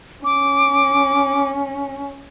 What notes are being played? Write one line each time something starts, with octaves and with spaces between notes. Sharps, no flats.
C#4 D6